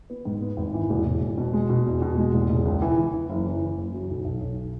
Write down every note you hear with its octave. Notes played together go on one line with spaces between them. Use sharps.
B3
G#2
B3
G#1
E3
E1
E1
E1
B2
G#3
B2
E2
B2
G#3
E1
E1
C#2
E3
E3
E3
F#1
E3
E3
F#1
F#3
B1
B1
B1